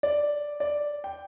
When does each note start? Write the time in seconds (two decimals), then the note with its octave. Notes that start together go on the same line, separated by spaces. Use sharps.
0.03 D5
0.60 D5
1.04 G5